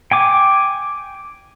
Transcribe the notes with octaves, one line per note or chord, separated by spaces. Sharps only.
G5 G#5 D6